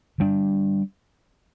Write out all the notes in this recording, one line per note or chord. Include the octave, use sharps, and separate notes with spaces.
D3 G3 B3 D4